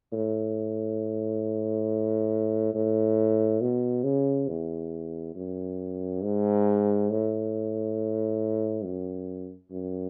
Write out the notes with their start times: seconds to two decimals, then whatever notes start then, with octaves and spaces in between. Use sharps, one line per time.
0.12 A2
2.74 A2
3.61 B2
4.04 C#3
4.48 E2
5.35 F#2
6.23 G#2
7.10 A2
8.84 F#2
9.71 F#2